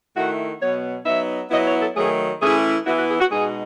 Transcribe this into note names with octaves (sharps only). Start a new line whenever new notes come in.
D#3 A3 E4 F#4
B2 F#3 B3 C#5
F#3 B3 D#4 E5
F#3 B3 E4 D#5
C#5
A4
D#3 F#3 A3 G#4
E3 A3 C#4 E4 G#4
E3 B3 E4 F#4
F#4
G#4
F#4
B2 G#3 D#4 G#4